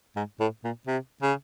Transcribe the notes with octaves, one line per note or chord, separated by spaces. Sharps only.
G#2
A2
A#2
C3
C#3